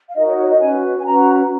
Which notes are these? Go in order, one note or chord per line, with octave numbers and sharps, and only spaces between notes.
F5
D#4 F#4 A#4 D#5
C#5
C#5
D#5
C#4 F#4 B4 G#5
G#5
C#4 F#4 B4 A#5